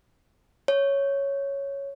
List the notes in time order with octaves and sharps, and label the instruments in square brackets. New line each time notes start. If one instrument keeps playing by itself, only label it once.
[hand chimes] C#5